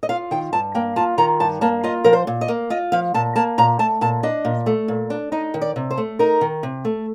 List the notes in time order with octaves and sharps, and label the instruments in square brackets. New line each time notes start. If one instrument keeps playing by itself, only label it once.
[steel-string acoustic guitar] D#5
F4 F5
D#3 G5
G2 A5
A#3 G5
F4 A5
D#3 A#5
G2 A5
A#3 A5
F4 D#5
F3 A#4
C5
A#2
D#5
A#3
F4 D#5
F3 F5
A#2 A5
A#3 A5
A#2 A#5
A3 A5
A#2 A5
D4 D#5
A#2
A3
A#2
D4
D#4 D#5
D#3
D5
C3
C5
A3
D#4 A#4
D#3
C3
A3